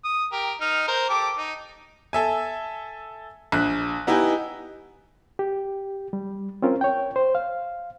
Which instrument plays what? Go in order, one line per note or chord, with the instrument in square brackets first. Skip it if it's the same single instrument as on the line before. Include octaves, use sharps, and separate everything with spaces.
[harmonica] D#6
G4 A#4
D#4 F6
A#4 C5
G4 A4 D6
D#4
[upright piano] A4 E5 G#5
A#1 F#6
B3 D#4 E4 G4 D#5 G#5
[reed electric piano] G4
G3
C4 C#4 F4 A#4
C#5 G5
C5
F5